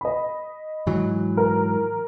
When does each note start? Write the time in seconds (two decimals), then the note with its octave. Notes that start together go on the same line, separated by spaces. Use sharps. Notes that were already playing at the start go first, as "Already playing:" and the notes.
0.01 D#5 B5
0.87 G#2 E3 F#3
1.37 A#4